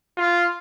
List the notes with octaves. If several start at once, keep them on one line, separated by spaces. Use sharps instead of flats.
F4